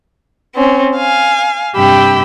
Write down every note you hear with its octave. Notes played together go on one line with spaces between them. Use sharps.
C4 C#4
F5 G#5
G2 C3 G4 G5 B5 E6